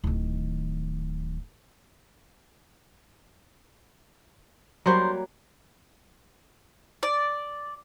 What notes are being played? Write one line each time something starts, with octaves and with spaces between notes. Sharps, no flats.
D1 D#3
D3 F#3 G3 A#3 C#4 C5
D5